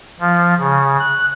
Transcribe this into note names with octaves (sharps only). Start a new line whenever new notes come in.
F3
C#3
F#6